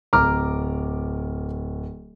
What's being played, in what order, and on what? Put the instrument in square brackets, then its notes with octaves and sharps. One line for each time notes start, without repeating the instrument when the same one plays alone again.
[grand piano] D1 [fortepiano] A#5 D6 F6